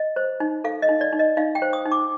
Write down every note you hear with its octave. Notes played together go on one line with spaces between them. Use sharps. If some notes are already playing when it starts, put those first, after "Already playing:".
Already playing: D#5
C5
D#4
A4 F5
D#5
D#4
D5
D#4
D#5
D#4 F5
G5
C5
D#6
D#4
D6